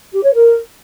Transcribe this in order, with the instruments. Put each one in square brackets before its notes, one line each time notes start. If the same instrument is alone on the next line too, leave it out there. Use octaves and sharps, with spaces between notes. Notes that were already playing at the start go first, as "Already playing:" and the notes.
[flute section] G4
C#5
A#4